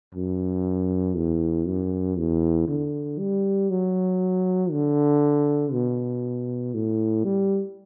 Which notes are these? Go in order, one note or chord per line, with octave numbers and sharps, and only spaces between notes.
F#2
E2
F#2
E2
D3
G3
F#3
D3
B2
A2
G3